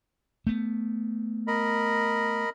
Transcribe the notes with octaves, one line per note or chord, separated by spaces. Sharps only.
A3 B3
A#4 D#5 B5